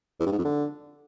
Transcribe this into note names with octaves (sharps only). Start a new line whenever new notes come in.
E2
G2
G#2
F2
D3